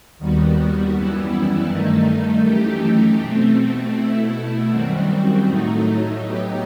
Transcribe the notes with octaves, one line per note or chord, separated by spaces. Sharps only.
D#2 D#3 G3 B3 F#4
F#2 E3 G3 B3 E4
G2 D#3 A3 D#4
F#2 E3 A3 D#4 G4
B2 A3 C4
B2 A3 E4
F#2 D#3 G3 C4 F#4
A2 F#3 A3 D#4
A2 F#3 B3 D#4 G4